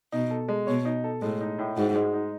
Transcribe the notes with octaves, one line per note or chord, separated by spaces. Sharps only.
B2 D#4
A4
G#3
B2 C#5
D#4
A4
A2 G#3
D#4
A2
G#2 F#4
G#3
D#4